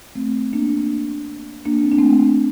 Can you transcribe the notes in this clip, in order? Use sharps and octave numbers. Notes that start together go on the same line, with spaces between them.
A3 C4
A#3 D4
A#3 D4
C4
D4
A3 C4